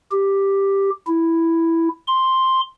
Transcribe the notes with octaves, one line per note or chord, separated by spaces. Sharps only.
G4
E4
C6